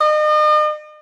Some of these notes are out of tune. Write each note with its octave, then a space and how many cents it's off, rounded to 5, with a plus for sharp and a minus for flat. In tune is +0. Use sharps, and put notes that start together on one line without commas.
D#5 -40